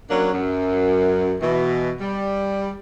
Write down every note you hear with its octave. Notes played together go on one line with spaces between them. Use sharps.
F#3 A#3 C#4 D4
F#2
B2 E3
G3